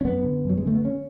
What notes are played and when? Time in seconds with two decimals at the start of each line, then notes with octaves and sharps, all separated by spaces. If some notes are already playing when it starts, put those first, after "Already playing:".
0.01 C#4
0.05 F#2 B3
0.24 D3
0.45 F#2 F#3
0.57 G#3
0.65 D3 A3
0.75 B3
0.85 C#4